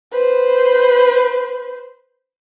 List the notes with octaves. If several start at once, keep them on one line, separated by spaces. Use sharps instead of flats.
B4 C5